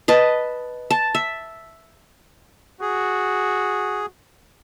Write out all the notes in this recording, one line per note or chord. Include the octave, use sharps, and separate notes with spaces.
B4 D#5 A5
A5
E5
F#4 G#4